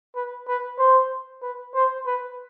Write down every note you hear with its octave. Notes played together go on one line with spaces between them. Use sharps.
B4
B4
C5
B4
C5
B4